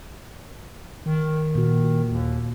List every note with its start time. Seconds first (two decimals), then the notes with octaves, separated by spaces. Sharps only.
1.06 D#3
1.55 A#2 F#4
2.11 D#2